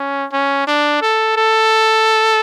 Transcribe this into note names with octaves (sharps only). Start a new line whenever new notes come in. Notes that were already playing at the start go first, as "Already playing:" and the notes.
Already playing: C#4
C#4
D4
A4
A4